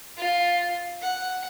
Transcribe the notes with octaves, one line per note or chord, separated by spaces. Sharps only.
F4
F#5